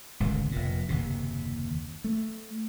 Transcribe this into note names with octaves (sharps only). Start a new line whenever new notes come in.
D1 G#1 C#2
F1 A#2
F#1 D#2 C3
A3